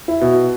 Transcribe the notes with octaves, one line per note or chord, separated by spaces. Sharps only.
E4
B2